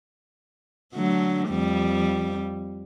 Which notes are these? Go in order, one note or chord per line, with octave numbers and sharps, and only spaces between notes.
D3 F#3 A3
F2 G3